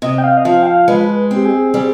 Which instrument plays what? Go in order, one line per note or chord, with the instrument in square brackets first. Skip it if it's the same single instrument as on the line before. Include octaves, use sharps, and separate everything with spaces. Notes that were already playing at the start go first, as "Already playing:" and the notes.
[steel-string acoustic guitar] C3 [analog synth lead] D#5
[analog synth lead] G5
F5
D#5
[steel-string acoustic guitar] F3 [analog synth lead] F5
[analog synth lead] G5
F5
[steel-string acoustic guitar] G#3 [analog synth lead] B4
[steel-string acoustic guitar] C4 [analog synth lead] G4
[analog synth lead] G#4
[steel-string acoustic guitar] G3 [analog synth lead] G#4